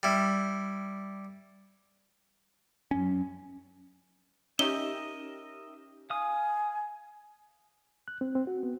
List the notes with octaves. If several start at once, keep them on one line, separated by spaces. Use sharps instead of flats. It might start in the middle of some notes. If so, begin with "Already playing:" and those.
G3 E4
F#2 C#4
C#4 D#4 G4 A#4 D#5 E5 G7
F5 G#5 D#6
F#6
C4
C4
F#4
B3